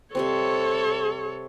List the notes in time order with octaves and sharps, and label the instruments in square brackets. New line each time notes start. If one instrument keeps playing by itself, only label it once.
[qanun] C3 G3 C4 [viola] A4 C#5